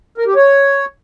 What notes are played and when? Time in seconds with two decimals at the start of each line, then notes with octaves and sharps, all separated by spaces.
0.18 A#4
0.27 G4
0.36 C#5